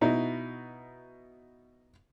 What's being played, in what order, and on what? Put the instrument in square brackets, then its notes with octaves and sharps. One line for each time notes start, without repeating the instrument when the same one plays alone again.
[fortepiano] B2 D#4 E4